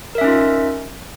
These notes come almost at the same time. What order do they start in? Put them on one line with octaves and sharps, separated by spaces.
A#4 E5 C#4 D#4 F4